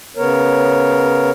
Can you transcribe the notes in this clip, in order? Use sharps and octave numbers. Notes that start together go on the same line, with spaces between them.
C#3 B3 A#4 C#5